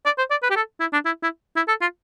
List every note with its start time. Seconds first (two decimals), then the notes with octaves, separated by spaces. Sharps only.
0.05 D5
0.18 C5
0.30 D5
0.43 B4
0.50 G4
0.56 A4
0.80 E4
0.93 D4
1.05 E4
1.23 E4
1.56 E4
1.68 A4
1.81 F4